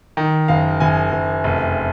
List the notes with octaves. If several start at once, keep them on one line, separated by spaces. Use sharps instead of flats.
D#3
F#1 F5
F#1 G#5
F#1
F1